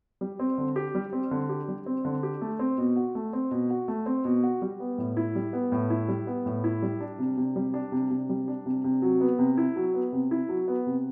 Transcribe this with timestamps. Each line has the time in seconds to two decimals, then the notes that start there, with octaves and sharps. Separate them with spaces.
0.21 G3
0.39 C4
0.58 D3
0.76 G4
0.95 G3
1.13 C4
1.31 D3
1.49 G4
1.68 G3
1.86 C4
2.05 D3
2.23 G4
2.41 A3
2.59 C4
2.78 B2
2.96 F#4
3.15 A3
3.33 C4
3.51 B2
3.70 F#4
3.88 A3
4.06 C4
4.25 B2
4.43 F#4
4.62 G3
4.80 B3
4.98 A2
5.17 E4
5.35 G3
5.53 B3
5.72 A2
5.90 E4
6.08 G3
6.27 B3
6.46 A2
6.64 E4
6.82 G3
7.01 D4
7.19 C3
7.37 C3
7.56 G3
7.74 D4
7.92 C3
8.10 C3
8.29 G3
8.48 D4
8.66 C3
8.84 C3
9.02 F#3
9.21 B3
9.39 C3
9.57 E4
9.76 F#3
9.94 B3
10.13 C3
10.31 E4
10.49 F#3
10.68 B3
10.87 C3